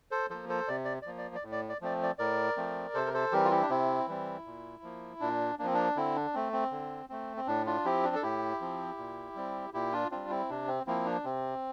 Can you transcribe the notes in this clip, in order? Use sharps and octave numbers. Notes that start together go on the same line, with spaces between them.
A4 C5
F3 A#3 A4 C5
A4 C5
C3 D5
D5
D5
F3 A#3
D5
D5
A2
D5
D5
F3 A3 C4 D5
D5
A2 A#4 D5
F3 A3 C4
C3 A4 C5
A#4
A4 C5
E3 G3 C4 G4 A#4
F4
E4 G4
D4
C3 C4 E4
E3 G3 C4
A#2
F3 A#3
A#2 D4
F3 A#3 C4 D4
D4
D3 C4 E4
D4
A3 C4
C4
D3
A3 C4
C4
A2 D4
D4 F4
F3 C4 E4 G4
D4
A4
A2 E4 G4
F3 C4
A#2
G3 C4
A#2 E4 G4
D4 F4
G3 C4 D4 F4
C4 E4
C3 D4
C4
F3 A#3 C4 E4
D4
C3 C4